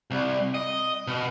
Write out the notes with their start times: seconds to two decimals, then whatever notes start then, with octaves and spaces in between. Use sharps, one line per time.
0.11 C2
0.54 D#5
1.07 B2